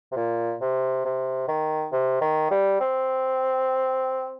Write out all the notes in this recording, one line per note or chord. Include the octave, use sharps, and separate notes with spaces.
C3
A#2
C3
C3
D#3
C3
D#3
G3
C4